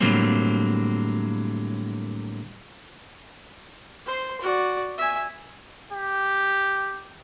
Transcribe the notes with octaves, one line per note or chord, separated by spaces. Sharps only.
A2 D3 F#3 G3 A#3 C4
C5 C6
F#4 D5
E5 G#5
G4